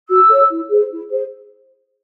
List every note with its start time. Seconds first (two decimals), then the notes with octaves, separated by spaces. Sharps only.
0.08 F#4 E6
0.29 A4 C#5
0.50 E4
0.70 G#4 C5
0.91 E4
1.11 G#4 C5